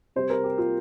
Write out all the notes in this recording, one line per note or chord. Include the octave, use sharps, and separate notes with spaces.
C3 G3 C5
A#4
G4
F4